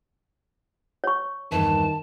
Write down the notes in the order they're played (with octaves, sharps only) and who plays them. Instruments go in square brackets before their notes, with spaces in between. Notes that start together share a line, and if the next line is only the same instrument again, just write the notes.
[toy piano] C#5 C#6
[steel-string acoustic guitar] E2 G2 E3 [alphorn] D#3 [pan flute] A5